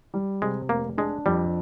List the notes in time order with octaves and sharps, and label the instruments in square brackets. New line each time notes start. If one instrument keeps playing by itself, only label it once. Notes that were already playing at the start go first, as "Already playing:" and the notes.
[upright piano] G3
[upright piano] C3 [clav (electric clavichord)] G#3
[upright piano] F1 [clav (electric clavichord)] A#3
[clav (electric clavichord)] G#3 [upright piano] D4
[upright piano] F2 [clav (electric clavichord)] G3